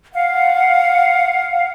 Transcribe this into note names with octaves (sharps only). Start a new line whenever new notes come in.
F5 F#5